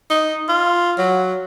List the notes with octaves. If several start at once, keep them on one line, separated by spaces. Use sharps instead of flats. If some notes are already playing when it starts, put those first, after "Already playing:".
D#4
F4
F#3